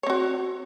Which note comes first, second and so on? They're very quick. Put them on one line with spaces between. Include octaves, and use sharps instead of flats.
C#5 C4 F#4